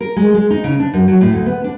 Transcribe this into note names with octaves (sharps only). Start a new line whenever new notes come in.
A#4
G#3
G#3
D#4
C#3
D4
F#2
F#3
A2
D2
B3
D4